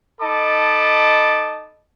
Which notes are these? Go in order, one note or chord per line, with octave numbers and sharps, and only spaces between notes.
D#4 A4 D#5 A5 B5 D6